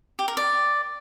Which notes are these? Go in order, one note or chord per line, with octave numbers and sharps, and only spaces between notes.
G4
A#4
D5